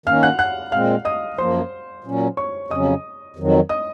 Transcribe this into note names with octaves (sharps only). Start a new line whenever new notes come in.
D#3 A#3 C#4 F5 F6
F#5 F#6
F#5 F#6
A#2 G#3 C4 F5 F6
D#5 D#6
F#2 F3 A#3 C5 C6
A#2 F#3 C#4
C#5 C#6
F2 C#3 F#3 C#4 D#5 D#6
F2 D#3 F#3
D#5 D#6